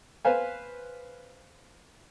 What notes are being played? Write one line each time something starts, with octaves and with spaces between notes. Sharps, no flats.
B4 C5 F5 G#5